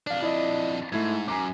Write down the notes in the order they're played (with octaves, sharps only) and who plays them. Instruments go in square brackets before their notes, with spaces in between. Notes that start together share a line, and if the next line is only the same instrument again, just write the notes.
[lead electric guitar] F2 D4 [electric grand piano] D5 F5
[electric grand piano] E4 D5 D#5
[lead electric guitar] G#2 [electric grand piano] A3 E4 G#6
[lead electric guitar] F#2 [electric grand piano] G#5 A#5 D6